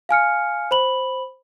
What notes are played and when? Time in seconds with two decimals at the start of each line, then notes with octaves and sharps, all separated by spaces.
0.09 F5 G#5 F6 C#7
0.71 C5 B5 F#7